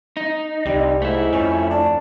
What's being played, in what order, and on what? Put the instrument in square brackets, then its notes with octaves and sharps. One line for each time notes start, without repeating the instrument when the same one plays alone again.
[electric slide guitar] D#4
[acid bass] C2 [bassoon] G3
[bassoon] G#2 [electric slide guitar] A3 E4
[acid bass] F2 [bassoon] C#4
[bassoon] D4